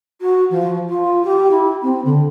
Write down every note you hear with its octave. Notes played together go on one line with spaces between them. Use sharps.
F#4
F3
F4
G4
E4
C4
D3